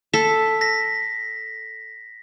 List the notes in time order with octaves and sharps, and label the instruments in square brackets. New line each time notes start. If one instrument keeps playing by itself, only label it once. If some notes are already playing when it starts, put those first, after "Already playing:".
[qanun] A4 [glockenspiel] B6
[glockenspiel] A#6 B6